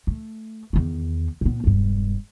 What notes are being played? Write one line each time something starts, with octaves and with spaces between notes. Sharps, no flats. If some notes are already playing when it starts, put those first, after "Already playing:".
A3
E2 D#3
A#2 B3
E1 G2